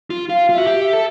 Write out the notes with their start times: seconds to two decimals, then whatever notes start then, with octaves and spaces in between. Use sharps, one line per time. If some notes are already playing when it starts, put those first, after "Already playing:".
0.10 F4
0.29 F4 F5
0.49 F4
0.54 F#4 E5
0.67 G4
0.79 E5
0.93 A4